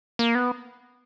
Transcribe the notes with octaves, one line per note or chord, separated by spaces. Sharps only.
A#3
B3